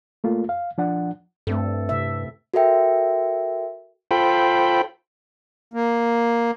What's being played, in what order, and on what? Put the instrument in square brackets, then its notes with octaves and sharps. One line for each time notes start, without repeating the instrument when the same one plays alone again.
[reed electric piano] A3 A#3 F4 A4
F5
F3 D4 F#5
[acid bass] G2 [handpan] A3 C4 A4
[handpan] C3 E5
[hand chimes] F#4 A4 A#4 E5 G5
[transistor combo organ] F4 A4 C5 G5 B5
[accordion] A#3